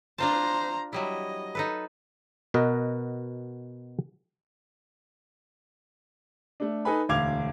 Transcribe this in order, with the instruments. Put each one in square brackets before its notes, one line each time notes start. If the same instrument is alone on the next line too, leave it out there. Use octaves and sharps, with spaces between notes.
[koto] D4 F4 A5 [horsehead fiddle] C5 A#5
[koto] F#3 G3 E4 [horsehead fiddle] D#5
[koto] D#4 A4 B4
[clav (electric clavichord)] B2 F#4 A#4 B4 D#5
[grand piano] A3 D4
D#4 A4 B4 G#5 B5
E1 D2 F5 D6 G#6 F7